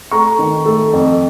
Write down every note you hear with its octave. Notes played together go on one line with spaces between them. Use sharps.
A3 A#5 C#6
D#3
A3
F2